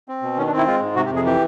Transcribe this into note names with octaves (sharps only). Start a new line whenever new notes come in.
C4
B2
D#3 C#4
D4
C4
E4
G#3 F4
G#2
C3 F#4
G4
F2
G#4
E3 G4